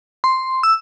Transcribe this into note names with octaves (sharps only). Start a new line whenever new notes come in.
C6
E6